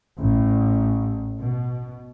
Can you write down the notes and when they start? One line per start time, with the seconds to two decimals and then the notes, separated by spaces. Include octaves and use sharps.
0.20 A1
1.39 B2